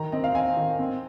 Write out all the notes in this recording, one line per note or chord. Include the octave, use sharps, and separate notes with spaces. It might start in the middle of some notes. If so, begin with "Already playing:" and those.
Already playing: D#3 A#5
C4 D#5
F5
C4 G#5
D#3
C4